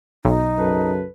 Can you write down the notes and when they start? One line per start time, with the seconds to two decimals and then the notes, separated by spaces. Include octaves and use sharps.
0.25 B1 D#4
0.58 F#2 C#3 A4 B4